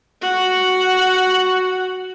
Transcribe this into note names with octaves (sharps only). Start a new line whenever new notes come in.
F#4 F#5